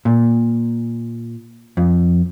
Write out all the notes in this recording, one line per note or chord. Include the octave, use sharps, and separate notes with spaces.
A#2
F2